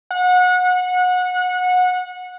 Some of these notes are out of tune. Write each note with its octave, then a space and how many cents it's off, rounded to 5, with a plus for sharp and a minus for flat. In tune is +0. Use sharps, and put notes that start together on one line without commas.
F#5 -25